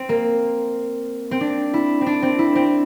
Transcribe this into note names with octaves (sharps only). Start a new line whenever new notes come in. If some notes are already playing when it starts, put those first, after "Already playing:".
Already playing: C4
A#3
C4
D4
E4
C4
D4
C4
E4
C4